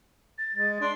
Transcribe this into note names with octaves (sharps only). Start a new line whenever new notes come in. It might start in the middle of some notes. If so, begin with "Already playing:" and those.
A6
G#3
D4 C6